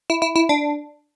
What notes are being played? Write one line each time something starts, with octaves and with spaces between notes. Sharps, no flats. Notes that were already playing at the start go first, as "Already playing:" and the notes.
E4
E4
E4
D4